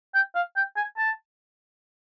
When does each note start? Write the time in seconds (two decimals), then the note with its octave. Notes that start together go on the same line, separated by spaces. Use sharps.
0.14 G5
0.35 F5
0.56 G5
0.77 G#5
0.97 A5